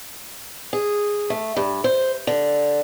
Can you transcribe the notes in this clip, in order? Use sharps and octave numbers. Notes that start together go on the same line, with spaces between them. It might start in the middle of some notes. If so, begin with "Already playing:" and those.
G#4
A3
G2
C5
D3